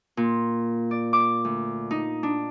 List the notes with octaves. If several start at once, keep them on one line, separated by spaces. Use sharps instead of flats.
A#2
D5
D6
D2
D#4
D4